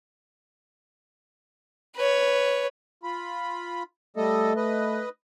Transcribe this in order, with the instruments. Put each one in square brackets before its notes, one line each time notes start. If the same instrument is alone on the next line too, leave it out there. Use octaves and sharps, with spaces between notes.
[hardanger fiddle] B4 C#5
[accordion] F4 B5
[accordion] G3 A4 D#5 [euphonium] A3
[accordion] B4 D#5